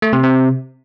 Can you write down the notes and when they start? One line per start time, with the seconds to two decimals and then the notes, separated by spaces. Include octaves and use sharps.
0.02 A3
0.13 C3
0.23 C3